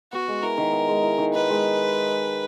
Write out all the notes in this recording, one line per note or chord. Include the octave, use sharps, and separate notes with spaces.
B3 F#4
G#3
E4 A#4
D#3
B3
G#3
E4
D#3
D#4 B4
G#3